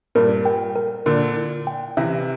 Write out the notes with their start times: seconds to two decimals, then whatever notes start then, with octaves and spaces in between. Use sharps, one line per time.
0.15 G2 A#2 A#4
0.45 G5
0.76 A#4
1.06 A#2 D3 A#4
1.37 E4
1.67 G5
1.97 C3 E3 E5